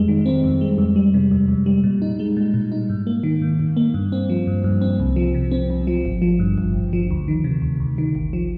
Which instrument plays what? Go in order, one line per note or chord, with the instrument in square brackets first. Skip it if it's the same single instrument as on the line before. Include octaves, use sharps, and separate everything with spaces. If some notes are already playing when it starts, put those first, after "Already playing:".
Already playing: [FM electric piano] F2 G3 G#3
D#3
C4
F2
G#3
F2
G3
C3
F2
F2
G3
A#2
D#4
G#3
A#2
A#2
D#4
G#2
A#3
D#3
G#2
G#2
A#3
G2
C4
F3
G2
G2
C4
C2
F3
C3
C4
C2
F3
G#1
F3
G2
G#1
G#1
F3
D2
D#3
C3
D2
D2
D#3
G#1
F3